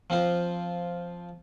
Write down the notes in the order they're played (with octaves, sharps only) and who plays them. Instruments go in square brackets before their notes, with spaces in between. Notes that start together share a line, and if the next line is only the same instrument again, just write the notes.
[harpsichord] F3 C4 F4 C5